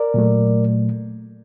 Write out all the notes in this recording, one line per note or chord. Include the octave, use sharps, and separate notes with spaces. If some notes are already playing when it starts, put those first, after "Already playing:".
Already playing: A#4 D5
A#2 F#3 A3